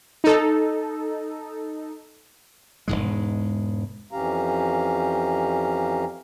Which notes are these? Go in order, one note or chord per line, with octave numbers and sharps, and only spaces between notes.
D#4 A4
E1 C#2 G#2 G#3
F2 E3 C#4 G4 F5 A#5